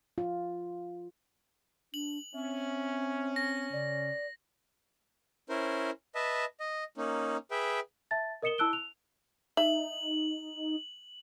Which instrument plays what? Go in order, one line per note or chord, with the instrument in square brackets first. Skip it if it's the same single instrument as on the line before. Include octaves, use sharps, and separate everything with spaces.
[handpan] F4
[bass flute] D4 [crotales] F#7
[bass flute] C4 [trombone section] C#4 [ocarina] E5
[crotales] A#6
[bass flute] C#3 [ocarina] D5
[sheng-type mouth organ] C#4 E4 A#4 C5
B4 D#5 E5 A5
D#5
A#3 C#4 D#4
G#4 B4 E5 G5
[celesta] E5 A5 A6
A#4 D#5 D#6 C#7 E7 G7
E4 A5 E6 F#6 D7 G7
F7
[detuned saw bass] D#4 [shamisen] E5 [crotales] F#7